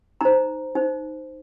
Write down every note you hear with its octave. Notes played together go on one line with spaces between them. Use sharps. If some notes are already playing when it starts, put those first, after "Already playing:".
D#4 C5 A#5
D#4 C5